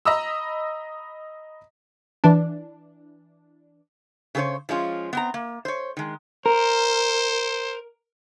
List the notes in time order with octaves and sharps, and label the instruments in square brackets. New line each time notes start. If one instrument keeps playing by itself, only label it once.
[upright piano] D#5 A#5 B5 D#6 E6
[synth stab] E3 D4
[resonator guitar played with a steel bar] C#3 G4 G#4 C5 C#5
F3 G#3 C#4 F4
B3 C4 A#5
A#3
C5 C#5
D#3 G#3
[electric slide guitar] A#4 [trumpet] C5